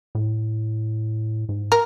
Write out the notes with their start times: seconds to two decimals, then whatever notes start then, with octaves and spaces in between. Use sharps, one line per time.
0.15 A2
1.49 G#2
1.72 A#4